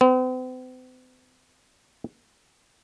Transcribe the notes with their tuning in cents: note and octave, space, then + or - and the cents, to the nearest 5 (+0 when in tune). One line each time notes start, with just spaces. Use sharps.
C4 -45